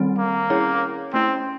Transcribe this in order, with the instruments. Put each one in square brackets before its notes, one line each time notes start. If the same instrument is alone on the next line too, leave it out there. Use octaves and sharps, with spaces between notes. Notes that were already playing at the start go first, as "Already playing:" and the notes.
Already playing: [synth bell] D#3 G3 C4
[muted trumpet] A#3
[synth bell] C#4 E4 G#4 C#5
[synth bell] A3 C#4 E4 [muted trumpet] C4